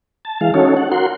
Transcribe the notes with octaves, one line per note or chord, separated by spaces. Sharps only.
A5
E3 G#3 F5
C#4 D#4 F#4 A4 C#5
F#5
F#4 A#4 F#5 C6